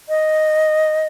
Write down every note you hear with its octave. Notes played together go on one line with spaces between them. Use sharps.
D#5